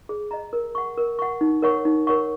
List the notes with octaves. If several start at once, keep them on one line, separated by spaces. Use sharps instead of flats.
G#4
D#5 A#5
A#4
F#5 C#6
A#4
F#5 C#6
D#4
A#4 C#5 F#5 C#6
D#4
A#4 C#5 F#5 C#6